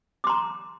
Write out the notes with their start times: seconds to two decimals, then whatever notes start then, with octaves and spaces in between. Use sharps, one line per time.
0.24 D6
0.27 C6
0.30 A#5